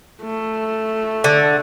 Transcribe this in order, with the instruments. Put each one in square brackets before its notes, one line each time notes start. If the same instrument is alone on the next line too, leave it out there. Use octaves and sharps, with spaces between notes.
[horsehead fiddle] A3
[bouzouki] D3